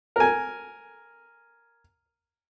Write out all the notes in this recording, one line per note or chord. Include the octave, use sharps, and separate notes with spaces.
A#4 G#5